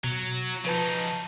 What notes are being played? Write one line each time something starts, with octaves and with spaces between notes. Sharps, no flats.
B2 F#3
C#3 F3 D#4 B4 A5